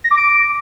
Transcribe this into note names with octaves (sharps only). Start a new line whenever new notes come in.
A#6
D6
D7